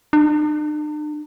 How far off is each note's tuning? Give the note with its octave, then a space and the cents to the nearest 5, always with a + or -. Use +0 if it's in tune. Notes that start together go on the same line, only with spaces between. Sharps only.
D4 +45